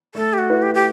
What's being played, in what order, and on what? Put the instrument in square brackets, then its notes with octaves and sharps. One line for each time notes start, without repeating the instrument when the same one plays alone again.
[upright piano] A3 [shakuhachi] A4
[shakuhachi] G4
F#4
[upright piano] E4 B4
[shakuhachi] G4
G4